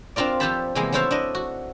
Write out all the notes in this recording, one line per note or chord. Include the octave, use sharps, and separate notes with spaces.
C4 D4 F4 A#4 D5
F3 G4 A4 C5 A5 B5
C3 E3 G#3 A#3 B3
F#3 A3 E4 A4 C5 F5
D4 E4 D#5
F#4